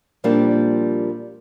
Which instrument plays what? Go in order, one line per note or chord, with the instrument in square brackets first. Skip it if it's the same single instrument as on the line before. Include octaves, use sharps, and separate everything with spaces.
[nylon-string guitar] A#2 F3 G3 A#3 C4 D4